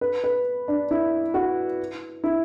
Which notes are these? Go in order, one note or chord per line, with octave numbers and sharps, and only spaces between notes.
B4
B4
D4
E4
F#4
E4